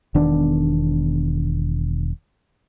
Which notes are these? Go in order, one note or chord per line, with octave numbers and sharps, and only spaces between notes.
E1 D#3 B3 D4